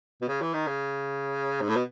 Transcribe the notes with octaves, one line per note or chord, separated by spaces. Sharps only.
B2
C#3
E3
D#3
C#3
G#2
A2
B2